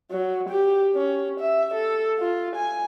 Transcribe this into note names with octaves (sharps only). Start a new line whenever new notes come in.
F#3
G4
C#4
E5
A4
F4
G#5